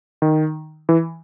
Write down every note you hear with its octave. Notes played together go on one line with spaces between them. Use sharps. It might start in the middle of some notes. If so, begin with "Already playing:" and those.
D#3
E3